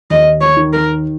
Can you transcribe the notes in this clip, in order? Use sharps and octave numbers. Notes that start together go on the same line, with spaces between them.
D#2 D#5
C#5
D#3
A#4